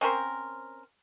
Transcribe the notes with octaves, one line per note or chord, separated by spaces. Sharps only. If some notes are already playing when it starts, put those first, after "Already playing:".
C4 C#4 A#4 C5